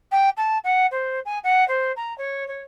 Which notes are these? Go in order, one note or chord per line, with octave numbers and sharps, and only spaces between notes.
G5
A5
F#5
C5
G#5
F#5
C5
A#5
C#5
C#5